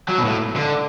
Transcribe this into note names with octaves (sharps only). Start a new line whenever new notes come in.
F#3
B2
A2
D3